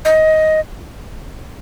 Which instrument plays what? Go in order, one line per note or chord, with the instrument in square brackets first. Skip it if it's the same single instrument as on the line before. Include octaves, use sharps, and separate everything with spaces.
[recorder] D#5